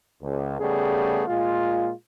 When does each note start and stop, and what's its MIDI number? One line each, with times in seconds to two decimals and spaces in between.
0.21 0.57 37
0.59 1.22 49
0.59 1.22 55
0.59 1.22 57
0.59 1.22 59
0.59 1.22 68
1.27 1.90 46
1.27 1.90 56
1.27 1.90 65